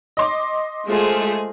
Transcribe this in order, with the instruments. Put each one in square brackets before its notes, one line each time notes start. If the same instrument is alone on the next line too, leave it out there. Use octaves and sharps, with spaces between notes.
[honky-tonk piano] D#5 C6 D6
[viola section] G#3 F4 C5 [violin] A3 G#4